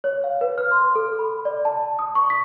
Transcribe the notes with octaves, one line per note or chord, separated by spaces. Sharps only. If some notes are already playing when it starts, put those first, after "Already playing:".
C#5
F5
B4
F6
C6
A4
B5
D5
A5
D#6
C#6
B6